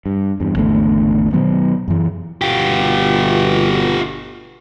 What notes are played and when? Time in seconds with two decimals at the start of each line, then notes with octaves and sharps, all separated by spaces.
0.06 G2
0.40 E2 G2
0.56 G#1 E2 D3 A3
1.33 B2 D#3 F#3 B3
1.88 F#2 E3
2.42 G1 B2 F4 G4